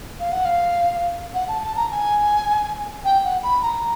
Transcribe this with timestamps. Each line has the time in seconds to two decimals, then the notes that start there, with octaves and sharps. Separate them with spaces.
0.20 F5
0.32 F#5
0.45 F5
1.34 F#5
1.48 A5
1.63 A5
1.76 A#5
1.91 G#5
3.05 G5
3.24 F#5
3.43 B5
3.62 A#5